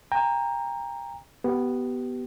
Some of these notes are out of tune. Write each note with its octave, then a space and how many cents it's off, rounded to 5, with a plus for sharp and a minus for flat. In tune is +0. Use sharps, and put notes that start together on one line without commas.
G5 +35 A#5 +0
B3 +0 G4 -25